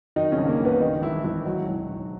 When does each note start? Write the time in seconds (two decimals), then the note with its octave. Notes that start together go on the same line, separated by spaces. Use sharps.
0.16 D#3 F#3 D#4
0.32 C#3 C#4
0.38 A#1
0.48 A#3
0.60 A#1
0.65 B3
0.80 D#3 D#4
1.02 E3 G#3 E4
1.24 G#1 E3 E4
1.45 F#3 G#3 F#4
1.66 B1
1.88 B1